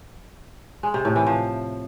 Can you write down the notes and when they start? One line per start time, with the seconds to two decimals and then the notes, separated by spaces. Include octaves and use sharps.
0.83 G#3
0.94 C3
1.05 A2
1.16 E3
1.27 F3